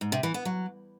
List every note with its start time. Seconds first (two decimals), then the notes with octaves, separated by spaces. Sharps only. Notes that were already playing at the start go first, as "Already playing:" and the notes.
0.01 G#2
0.12 C3
0.23 E3
0.34 B3
0.45 F#3